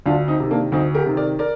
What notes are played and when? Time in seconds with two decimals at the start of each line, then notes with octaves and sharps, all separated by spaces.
0.06 D2 D4 F4
0.28 C4 D#4
0.40 C3 D#3
0.51 A#3 D4
0.72 D2 C4 D#4
0.94 G4 A#4
1.06 C3 D#3
1.17 A#4 D5
1.39 A#4 D5